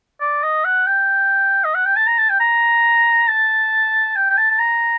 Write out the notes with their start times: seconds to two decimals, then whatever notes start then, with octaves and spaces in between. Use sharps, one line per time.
0.21 D5
0.43 D#5
0.65 F#5
0.87 G5
1.64 D#5
1.75 F#5
1.86 G5
1.96 A5
2.07 A#5
2.18 A5
2.29 G5
2.40 A#5
3.28 A5
4.16 G5
4.30 G5
4.38 A5
4.51 A5
4.59 A#5